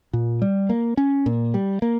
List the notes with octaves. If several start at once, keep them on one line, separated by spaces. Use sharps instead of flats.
A#2
G3
A#3
C#4
A#2
G3
A#3